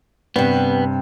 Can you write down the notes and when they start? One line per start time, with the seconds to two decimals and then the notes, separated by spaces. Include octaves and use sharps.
0.36 G2 C3 B3